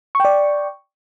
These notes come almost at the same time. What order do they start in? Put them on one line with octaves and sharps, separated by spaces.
C#6 G5 D5